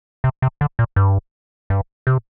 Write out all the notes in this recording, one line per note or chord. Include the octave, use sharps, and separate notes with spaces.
C3
C3
D3
A#2
G2
G2
C3